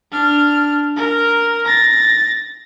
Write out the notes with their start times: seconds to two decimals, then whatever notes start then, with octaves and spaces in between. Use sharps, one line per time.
0.11 D4 F6
0.96 A#4
1.65 A6 A#6